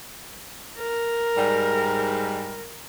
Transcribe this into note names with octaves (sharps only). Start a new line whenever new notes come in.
A#4
G#2 G3